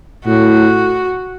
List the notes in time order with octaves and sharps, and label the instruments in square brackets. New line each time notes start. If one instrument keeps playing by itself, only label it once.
[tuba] A2 [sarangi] F#4